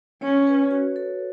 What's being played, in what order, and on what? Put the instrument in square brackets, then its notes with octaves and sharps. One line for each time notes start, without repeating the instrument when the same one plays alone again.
[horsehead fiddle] C#4 [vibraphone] C#5
[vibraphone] B4
F#4
A4